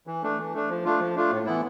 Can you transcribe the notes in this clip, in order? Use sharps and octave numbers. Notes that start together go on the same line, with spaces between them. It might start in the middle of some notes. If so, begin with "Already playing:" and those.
E3
A3 D4
E3
A3 D4
F3
A3 D4 F4
F3
A3 D4 F4
A2
E3 B3 E4